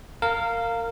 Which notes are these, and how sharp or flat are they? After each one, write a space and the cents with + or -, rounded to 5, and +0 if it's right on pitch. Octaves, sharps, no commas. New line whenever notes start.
A#4 -20 F5 +0